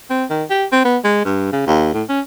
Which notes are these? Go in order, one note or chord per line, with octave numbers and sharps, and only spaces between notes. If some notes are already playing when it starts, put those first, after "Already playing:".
C4
D#3
G4
C4
B3
G#3
G2
C#3
D#2
A2
C#4